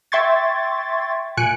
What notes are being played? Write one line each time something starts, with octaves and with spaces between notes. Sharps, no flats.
E5 G5 C6 C#6 G#6 A6
A#2 G#5 F#6 C#7 D7